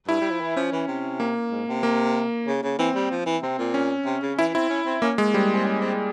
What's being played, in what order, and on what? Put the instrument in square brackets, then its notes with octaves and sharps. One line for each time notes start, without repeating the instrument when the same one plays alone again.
[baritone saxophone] G2 [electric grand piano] E4
[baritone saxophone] G3
F3
E3
[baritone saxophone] F3 [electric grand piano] C#4
[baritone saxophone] E3
C3
[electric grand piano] A#3
[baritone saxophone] G#2
C3
[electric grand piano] A#3
[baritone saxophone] C#3
C#3
[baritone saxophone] E3 [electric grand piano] C4
[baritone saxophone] G3
F3
E3
[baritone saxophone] C3 [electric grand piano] C4
[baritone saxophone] A#2
[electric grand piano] C#4
[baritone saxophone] C3
C#3
[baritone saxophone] E3 [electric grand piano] E4
[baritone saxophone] C4 [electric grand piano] E4
[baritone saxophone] C#4
C4
[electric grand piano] A#3 [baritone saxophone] C#4
[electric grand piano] G#3
[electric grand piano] G3 [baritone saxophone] C4
[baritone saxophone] G#3
C4
C#4
C4